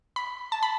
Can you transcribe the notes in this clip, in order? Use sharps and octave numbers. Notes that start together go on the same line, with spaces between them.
B5
A5
B5